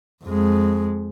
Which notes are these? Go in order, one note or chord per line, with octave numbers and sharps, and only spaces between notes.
F2 G#3